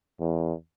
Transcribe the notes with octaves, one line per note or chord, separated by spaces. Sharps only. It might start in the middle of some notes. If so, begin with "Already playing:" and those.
E2